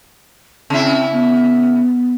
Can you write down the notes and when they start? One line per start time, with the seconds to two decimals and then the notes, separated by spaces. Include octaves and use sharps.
0.70 C#3 C4 E4
1.12 B3